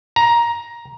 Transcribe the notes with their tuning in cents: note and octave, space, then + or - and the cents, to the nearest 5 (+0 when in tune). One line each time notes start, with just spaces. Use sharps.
A#5 +15